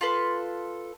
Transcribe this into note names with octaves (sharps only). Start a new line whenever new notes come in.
F4 A4 B4 C6